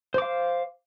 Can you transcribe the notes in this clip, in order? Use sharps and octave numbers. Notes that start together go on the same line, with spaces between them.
C5 F5 D6